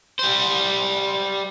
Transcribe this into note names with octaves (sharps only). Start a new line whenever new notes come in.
G3 C5